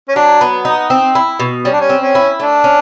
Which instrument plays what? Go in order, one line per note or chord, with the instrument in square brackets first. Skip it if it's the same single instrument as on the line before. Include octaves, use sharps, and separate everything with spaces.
[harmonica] C#4
[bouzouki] F#3 [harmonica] D4
[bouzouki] B3
D#4
C4
E4
B2
[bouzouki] G3 [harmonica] C#4
[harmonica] D4
C#4
[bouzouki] C4
[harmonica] C#4
[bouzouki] E4
[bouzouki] A3 [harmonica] D4
[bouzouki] C#4